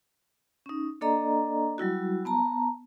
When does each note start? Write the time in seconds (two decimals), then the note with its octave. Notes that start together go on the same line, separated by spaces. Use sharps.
0.66 C#4 D#4
1.01 A#3 D4 A4 D5 D#5 A#5
1.78 F#3 G3 E4 F#4
2.25 B3 A5 A#5